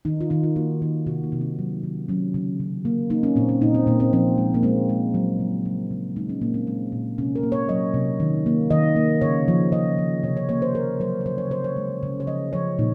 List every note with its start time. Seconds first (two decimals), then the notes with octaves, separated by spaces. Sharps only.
0.05 D#3 D#4
0.21 F4
0.30 D#3 D#4
0.43 F4
0.56 A#3 F#4
0.82 D#3
1.06 C3 F#4
1.23 A#3
1.32 C3
1.41 C4
1.59 F#3
1.84 D#3
2.08 F#3 C#4
2.34 C#3
2.60 C#3
2.85 A#3
3.10 A#3 D#4
3.23 C#4
3.36 A#2 C4
3.49 C#4
3.61 A#2 D#4
3.74 C4
3.87 A#2 A#3
4.00 C4
4.13 F3 C4
4.38 G#3
4.54 A#3
4.63 G#3 C4
4.89 G#3
5.14 F#3
5.40 C#3
5.66 F#3
5.91 C#3
6.16 G#3 D#4
6.29 C#4
6.42 A#2 A#3
6.54 C4
6.67 G#3 C4
6.92 A#2
7.18 C3 C#4
7.35 A#4
7.43 A#3
7.52 C#5
7.69 F#3 D#5
7.94 C3
8.20 D#3
8.46 A#3
8.70 D#3 D#5
8.96 A#3
9.21 C#3 C#5
9.48 F3
9.72 C#3 D#5
9.99 F3
10.23 C3 C#5
10.37 C#5
10.49 A#3 C#5
10.62 C5
10.75 A#3 A#4
11.00 F#3 C5
11.21 C#5
11.26 C#3 C5
11.38 C#5
11.51 C#3 C5
11.64 C#5
11.77 G#3
12.03 C#3
12.20 C#5
12.27 F3 D#5
12.53 F3 C#5
12.79 A#2 D#4